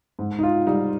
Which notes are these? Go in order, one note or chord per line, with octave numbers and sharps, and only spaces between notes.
G#2
D#4
F4
G3 D#4